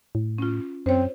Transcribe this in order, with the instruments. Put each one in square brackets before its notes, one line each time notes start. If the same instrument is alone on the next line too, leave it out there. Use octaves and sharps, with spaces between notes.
[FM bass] A2
[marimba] C#4 F4
[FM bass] F#2 [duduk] C4 [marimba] C5 C#5